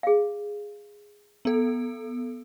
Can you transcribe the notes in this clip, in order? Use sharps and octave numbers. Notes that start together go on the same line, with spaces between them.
G#4 F5
B3 A4